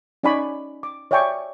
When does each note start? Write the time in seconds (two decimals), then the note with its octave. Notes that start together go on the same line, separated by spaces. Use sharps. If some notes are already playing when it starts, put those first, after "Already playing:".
0.23 C#4 D#4 D5 G#5 B5 C#6
0.83 D6
1.11 C#5 D5 E5 G5 G#5 C#6